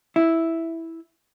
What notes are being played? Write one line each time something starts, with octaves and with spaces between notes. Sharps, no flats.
E4